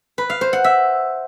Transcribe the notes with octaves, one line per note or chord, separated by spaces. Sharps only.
B4
F5
C5
F#5
E5